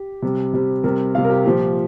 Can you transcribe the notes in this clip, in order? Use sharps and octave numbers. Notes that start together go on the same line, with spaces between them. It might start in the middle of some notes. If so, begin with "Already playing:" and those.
Already playing: G4
C3 G3
C3 G3
C3 G3 A#4
C3 G3 F5
A#4
G4
A#2 F3 G4